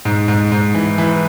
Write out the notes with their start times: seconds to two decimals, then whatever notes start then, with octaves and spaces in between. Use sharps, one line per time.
0.05 G#2
0.28 G#2
0.52 G#2
0.75 E3
0.98 E3